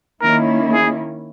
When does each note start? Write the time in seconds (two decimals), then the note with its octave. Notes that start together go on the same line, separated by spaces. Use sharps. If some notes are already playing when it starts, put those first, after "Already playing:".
0.22 D#3 A#3 C#4 E4 A#4
0.73 G#4